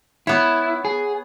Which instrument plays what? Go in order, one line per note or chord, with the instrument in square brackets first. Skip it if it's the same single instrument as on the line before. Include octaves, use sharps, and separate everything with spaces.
[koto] B3 C#5 [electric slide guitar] E4
[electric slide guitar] G#4